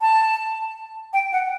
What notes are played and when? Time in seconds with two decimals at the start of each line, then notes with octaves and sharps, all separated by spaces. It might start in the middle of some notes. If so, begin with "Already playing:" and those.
0.01 A5
1.13 G5
1.32 F#5